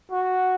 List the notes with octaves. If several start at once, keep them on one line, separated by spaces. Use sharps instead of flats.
F#4